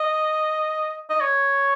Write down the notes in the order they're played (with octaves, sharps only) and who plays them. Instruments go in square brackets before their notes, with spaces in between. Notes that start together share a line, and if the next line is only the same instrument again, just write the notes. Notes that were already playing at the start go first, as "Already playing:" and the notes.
Already playing: [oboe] D#5
D#5
C#5